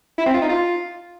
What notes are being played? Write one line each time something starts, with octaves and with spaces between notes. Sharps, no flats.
E4
C4
F4
D#4
F4